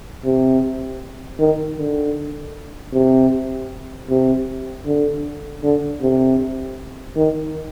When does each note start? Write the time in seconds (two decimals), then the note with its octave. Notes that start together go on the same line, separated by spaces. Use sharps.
0.25 C3
1.40 D#3
1.78 D3
2.93 C3
4.10 C3
4.86 D3
5.63 D3
6.01 C3
7.17 D#3